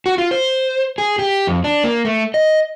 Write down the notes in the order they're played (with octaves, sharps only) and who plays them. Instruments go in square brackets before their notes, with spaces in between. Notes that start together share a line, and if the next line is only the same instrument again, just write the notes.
[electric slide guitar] F#4
F4
C5
G#4
G4
F2
D4
A#3
A3
D#5